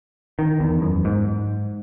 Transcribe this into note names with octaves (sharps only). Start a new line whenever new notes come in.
D#3
E2
F#2
G#2